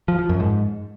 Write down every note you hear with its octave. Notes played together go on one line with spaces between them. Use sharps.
F3
F3
F#2
G#2